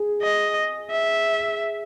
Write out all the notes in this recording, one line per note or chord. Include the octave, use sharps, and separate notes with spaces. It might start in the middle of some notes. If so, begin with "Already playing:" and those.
Already playing: G#4
D#5
E5